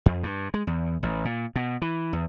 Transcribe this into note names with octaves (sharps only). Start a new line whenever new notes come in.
F2
G2
G#3
E2
A1
A#2
B2
E3
E2